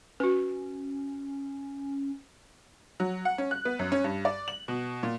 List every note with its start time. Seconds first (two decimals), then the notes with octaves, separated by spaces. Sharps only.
0.20 C#4 F#4 B4
3.00 F#3
3.25 F#5
3.38 C#4
3.51 F#6
3.65 B3
3.79 F#2
3.92 C#4
4.04 G2
4.25 D5
4.48 F#7
4.68 B2
5.03 A#2